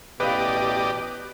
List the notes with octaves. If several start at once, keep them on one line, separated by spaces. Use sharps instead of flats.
A1 B2 G4 B4 D5 D#5 F5